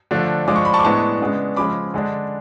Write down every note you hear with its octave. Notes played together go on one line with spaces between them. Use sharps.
D3 F3 A3 D4
F3 G#3 D4 D6
C#6
B5
A5 C#6
D6
A2 G#3 B3 D4 A5 C#6
C#3 G#3 B3 D4
C#3 F3 G#3 C#4 B5 D6
D3 G#3 D4